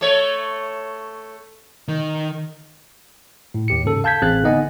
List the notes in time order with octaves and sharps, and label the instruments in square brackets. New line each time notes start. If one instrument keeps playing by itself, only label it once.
[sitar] A3 C#5
[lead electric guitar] D#3
[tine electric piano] A2
D#2 G4 C#7
G#2 C#3 A4
F5 A5 G6 G#6 B6
A1 C4 G#4 F5 F#6 A6
D3 B3 D#4 D#5 F#5 G#5